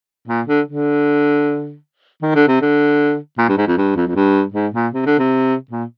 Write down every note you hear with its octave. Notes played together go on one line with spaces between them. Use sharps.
A#2
D3
D3
D#3
D3
C3
D3
A#2
G2
G#2
F2
G2
F2
F2
G2
G#2
A#2
C3
D3
C3
A#2